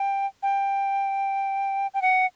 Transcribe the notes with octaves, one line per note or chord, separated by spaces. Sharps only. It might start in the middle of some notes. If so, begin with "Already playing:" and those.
Already playing: G5
G5
G5
F#5